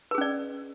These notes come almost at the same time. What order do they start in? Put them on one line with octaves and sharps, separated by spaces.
B4 G#4 C#4 D5